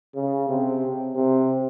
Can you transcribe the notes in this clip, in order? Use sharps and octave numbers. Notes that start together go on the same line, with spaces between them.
C#3
C3
C3